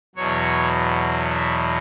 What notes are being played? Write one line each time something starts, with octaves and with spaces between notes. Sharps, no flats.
E2 B2 F#3 C#5
E5